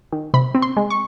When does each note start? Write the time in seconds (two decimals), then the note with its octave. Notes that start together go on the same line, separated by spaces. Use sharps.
0.12 D#3
0.34 C3 B5
0.55 C4
0.62 C6
0.77 G#3
0.90 C#6